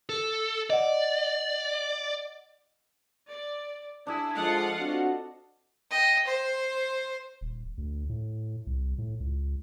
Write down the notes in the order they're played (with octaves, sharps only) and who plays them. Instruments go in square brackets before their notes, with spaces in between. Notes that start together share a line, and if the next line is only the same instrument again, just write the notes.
[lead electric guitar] A4
[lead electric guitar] D5 [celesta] D#5 F#5
[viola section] D5
[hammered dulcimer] D4 G#4 [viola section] E4
[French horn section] F3 G#3 [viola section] F4 F5 F#5 [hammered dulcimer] A4 D#5
[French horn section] C4 D4 F#4
[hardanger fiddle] D#5 G5
C5
[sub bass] D#1
D2
A2
C2
A2
C#2